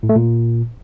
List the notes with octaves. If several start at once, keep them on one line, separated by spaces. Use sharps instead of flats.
A2
A3
A#2